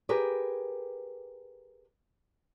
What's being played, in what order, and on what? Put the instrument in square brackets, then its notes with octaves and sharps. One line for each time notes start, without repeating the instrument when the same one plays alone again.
[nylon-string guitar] G4 G#4 A#4 B4